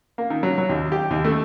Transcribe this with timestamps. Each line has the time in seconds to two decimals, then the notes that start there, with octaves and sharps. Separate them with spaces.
0.18 A#3
0.30 D#3
0.43 F#3
0.58 F#3
0.69 D#2
0.92 G4
1.11 D#2
1.25 A3